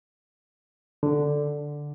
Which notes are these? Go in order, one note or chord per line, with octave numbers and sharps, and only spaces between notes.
D3